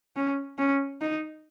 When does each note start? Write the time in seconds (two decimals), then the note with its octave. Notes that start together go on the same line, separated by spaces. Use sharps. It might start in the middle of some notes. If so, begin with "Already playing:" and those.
0.16 C#4
0.58 C#4
1.01 D#4